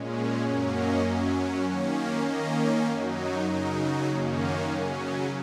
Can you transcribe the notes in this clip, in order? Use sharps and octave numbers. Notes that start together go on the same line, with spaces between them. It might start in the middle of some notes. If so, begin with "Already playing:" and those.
Already playing: A#2 G#3 C#4
F#2 F#3 A#3 C#4 F#5
D#5
F#2 F#3 C#4
D#3 A#3 C#4 F#5
D#5
D#3 A#3 C#4 D#5
F#2 F#3 D#4
C#5
C#3 F#3 D#4 A#4
F#2 D#3 A#3 C#4 G#4
F#5
C#3 F#3 C#4
D#5